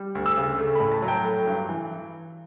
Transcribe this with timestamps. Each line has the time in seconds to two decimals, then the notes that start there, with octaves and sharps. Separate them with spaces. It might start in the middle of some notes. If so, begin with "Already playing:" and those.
Already playing: G3
0.15 D2
0.26 E6
0.37 C#3
0.58 A3
0.75 B5
0.80 A2
0.92 A5
1.02 F#3
1.08 G5
1.25 A3
1.47 G2
1.69 E3